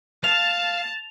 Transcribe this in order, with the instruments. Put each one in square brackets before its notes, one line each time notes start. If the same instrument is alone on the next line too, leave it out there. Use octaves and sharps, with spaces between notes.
[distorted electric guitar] F5 [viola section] A5 [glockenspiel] F7